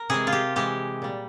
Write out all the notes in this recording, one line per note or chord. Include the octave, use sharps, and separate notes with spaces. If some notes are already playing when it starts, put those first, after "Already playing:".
Already playing: A#4
C3 E3 G#3 G#4
F4
G4
C3 E3 G#3 G4
A#2 G3